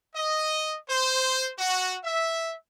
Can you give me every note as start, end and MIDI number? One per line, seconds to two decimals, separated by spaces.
0.14 0.75 75
0.90 1.50 72
1.59 1.97 66
2.04 2.55 76